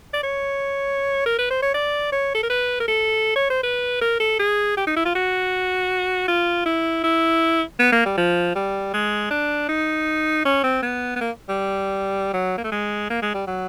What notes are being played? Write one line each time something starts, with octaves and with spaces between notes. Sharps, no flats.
D5
C#5
A#4
B4
C5
C#5
D5
C#5
A4
A#4
B4
A#4
A4
C#5
C5
B4
A#4
A4
G#4
G4
D#4
E4
F4
F#4
F4
E4
E4
B3
A#3
G3
F3
G3
G#3
D4
D#4
C#4
C4
B3
B3
A#3
G3
F#3
A#3
A3
G#3
A#3
G#3
G3
F#3